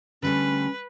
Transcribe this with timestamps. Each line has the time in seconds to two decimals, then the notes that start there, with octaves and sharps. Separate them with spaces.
0.23 D3 G3 A3 C#4 B4